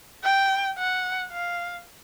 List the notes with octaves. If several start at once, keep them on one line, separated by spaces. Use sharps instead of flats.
G5
F#5
F5